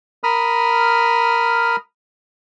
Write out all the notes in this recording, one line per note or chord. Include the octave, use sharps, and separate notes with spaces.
A#4 B5 D#6 F6